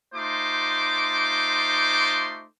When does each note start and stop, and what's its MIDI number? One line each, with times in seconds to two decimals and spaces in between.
0.14 2.45 57
0.14 2.45 63
0.14 2.45 65
0.14 2.45 72
0.14 2.45 84
0.14 2.45 86